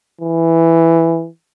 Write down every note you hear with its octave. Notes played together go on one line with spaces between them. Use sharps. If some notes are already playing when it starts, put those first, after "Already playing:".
E3